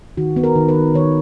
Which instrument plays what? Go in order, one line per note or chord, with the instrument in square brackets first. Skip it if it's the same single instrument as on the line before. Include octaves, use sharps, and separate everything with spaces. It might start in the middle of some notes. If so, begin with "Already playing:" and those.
[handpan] D#3 F#4
B3
A#4
D#3
B4
D#3
D#3 C#5